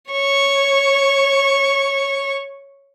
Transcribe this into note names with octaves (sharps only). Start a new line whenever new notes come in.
C#5 C#6